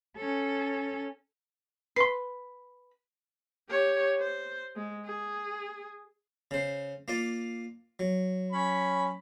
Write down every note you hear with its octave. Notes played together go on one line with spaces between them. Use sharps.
C#4 A4
B4 C6 C7
G4 C#5
C5
G#3
G#4
C#3 C5
A#3 F4 D5
F#3
C#4 B5